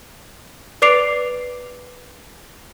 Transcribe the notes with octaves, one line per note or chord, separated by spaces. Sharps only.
B4 D5 D6 C7 D7 F7